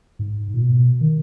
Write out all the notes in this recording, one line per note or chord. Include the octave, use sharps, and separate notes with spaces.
G#2
A#2
B2
D#3